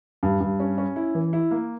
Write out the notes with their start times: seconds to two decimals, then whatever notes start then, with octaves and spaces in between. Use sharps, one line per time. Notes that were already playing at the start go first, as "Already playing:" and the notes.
0.23 G2
0.41 G2
0.60 C#4
0.78 C#4
0.96 E4
1.15 E3
1.33 E4
1.51 A#3